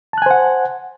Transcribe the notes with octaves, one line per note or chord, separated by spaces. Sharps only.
C5 F#5 G#5 A5 F#6